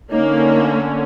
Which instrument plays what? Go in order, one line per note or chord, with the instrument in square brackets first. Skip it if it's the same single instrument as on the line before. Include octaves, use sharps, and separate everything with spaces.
[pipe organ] D3 C#4 [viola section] A#3 [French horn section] D#4 C#5